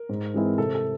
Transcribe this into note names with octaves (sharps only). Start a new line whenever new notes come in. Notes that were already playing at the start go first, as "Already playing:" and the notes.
Already playing: A#4
G#2
E3 G#3 C4 E4
C3 A4
A4